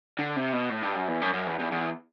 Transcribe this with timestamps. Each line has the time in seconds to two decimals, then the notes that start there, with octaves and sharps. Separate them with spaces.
0.19 D3
0.36 C3
0.53 B2
0.70 A2
0.83 G2
0.95 F#2
1.08 E2
1.22 F#2
1.33 F#2
1.47 E2
1.60 E2
1.72 E2